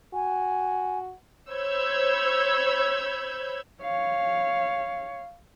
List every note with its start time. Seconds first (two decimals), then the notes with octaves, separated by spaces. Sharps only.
0.14 F#4 G#5
1.51 C5 C#5 B5 E6 G6 G#6
3.81 C#5 F5